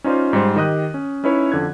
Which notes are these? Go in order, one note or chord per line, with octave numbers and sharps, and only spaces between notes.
C#4 D#4 F4 C5 D5
G#2 G3 C5
D#3 G4 D#5 D#6 F#6
C#4
C#4 D#4 E4 B4 C#5
F2 D3 F#6 G#6